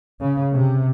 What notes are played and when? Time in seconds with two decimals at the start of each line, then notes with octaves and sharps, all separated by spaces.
0.20 C#3
0.53 C3